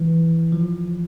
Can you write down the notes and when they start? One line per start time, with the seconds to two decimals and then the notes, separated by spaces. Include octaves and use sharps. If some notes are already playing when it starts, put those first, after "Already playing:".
Already playing: E3
0.52 F3